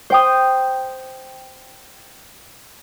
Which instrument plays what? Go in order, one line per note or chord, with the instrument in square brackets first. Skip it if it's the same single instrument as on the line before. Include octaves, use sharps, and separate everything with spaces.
[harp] C5 G5 D#6